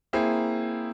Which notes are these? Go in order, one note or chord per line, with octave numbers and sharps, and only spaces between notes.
A#3 C4 E4 G#4